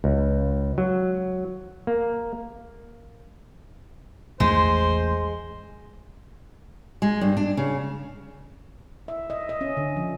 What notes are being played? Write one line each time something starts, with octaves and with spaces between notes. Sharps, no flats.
C#2
F#3
A#3
A1 E2 G#3 A3 C5
G#3
G2
D4
C#3
E5
D#5
D#5
C#4
D3
F3